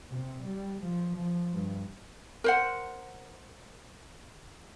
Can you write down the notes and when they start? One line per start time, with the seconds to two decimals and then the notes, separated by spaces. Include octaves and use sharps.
0.10 C3
0.42 G3
0.81 F3
1.16 F3
1.53 G2
2.44 A#4 C5 F#5